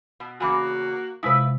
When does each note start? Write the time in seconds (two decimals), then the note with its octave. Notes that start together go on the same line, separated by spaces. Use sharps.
0.20 B2
0.40 E2 C#3 A#3 F#4 G#5 B5 D6
1.23 C3 G#3 E4 F4 B4 D#6